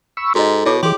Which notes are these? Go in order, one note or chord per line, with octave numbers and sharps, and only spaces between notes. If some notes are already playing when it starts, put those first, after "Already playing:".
B5 C#6 E6
G#2 F#4 A4 D#5
B2 E4 C#5 D6
E3 G4 G#4 C6